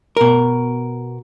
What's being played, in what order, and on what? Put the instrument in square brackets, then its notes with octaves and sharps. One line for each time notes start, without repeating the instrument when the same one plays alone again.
[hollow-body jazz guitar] B2 A#4